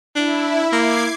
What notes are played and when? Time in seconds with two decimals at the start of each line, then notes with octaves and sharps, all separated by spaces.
0.16 D4 E4
0.72 A#3 D6 G#6 C7